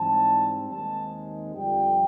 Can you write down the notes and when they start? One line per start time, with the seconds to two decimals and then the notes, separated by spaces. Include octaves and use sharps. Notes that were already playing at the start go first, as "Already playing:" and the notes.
Already playing: G#2 E3 G3 C4 A5
0.71 D#2 D#3 G#3 C4 A5
1.55 F2 D3 G3 G5